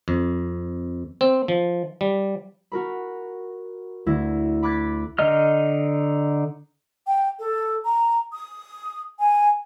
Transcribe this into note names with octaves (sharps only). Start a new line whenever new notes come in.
F2
C4
F3
G3
F#4 A#4 B5
D2 E4 G#6 A#6
B5 D6 F#6 G#6 A6 B6
D3 D#4 D#5 F6
G5
A4
A#5
D#6
G#5